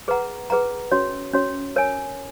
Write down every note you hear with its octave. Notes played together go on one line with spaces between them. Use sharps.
G#4 B4 F#5 A#5
G#4 B4 F#5 A#5
C#4 F#4 C#5
C#4 F#4 C#5
A#4 C#5 G#5